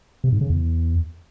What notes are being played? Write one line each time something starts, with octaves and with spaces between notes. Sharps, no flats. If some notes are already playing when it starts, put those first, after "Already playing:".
C3
G#2
C#3
E2